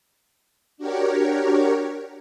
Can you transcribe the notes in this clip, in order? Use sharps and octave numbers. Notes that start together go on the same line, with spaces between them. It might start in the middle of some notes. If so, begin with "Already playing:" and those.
D4 F#4 G4 A#4 C#5